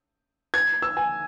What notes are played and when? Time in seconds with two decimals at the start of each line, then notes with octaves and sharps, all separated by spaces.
0.54 G#6
0.82 E6
0.97 G#5